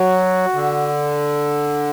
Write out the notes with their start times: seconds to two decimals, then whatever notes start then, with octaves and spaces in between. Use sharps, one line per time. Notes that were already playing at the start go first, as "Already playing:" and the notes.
Already playing: F#3 F#4
0.54 D3